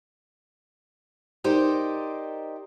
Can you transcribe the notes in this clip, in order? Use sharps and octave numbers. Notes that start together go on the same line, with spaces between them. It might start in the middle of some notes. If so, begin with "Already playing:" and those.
D#4 G4 A#4 C5 D5 D#5